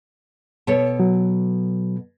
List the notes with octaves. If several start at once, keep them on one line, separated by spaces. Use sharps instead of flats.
B2 A4 C#5
F#3